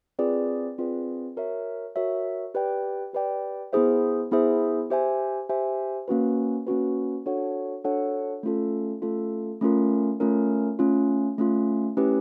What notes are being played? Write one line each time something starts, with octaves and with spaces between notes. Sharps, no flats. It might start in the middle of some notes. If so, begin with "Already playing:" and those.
C4 F4 G#4 B4 D5
C4 F4 G#4 B4 D5
F#4 A#4 C#5 E5
F#4 A#4 C#5 E5
G4 B4 D5 G5
G4 B4 D5 G5
B3 E4 G#4 C5 E5
B3 E4 G#4 C5 E5
G4 C5 E5 G#5
G4 C5 E5 G#5
A#3 C#4 F#4 B4
A#3 C#4 F#4 B4
D4 F#4 A4 C#5 F#5
D4 F#4 A4 C#5 F#5
A3 C#4 F4 A4
A3 C#4 F4 A4
A3 C#4 F4 A#4
A3 C#4 F4 A#4
A3 C#4 F4
A3 C#4 F4
A3 C#4 E4 G4 B4